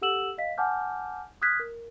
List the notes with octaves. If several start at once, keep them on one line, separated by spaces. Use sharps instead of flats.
G4 A4 F#5 E6 E7 F#7
D#5 F5 B6
F#5 G#5 A5 D6 F6 G6
D#6 F6 F#6 G#6 B6
A#4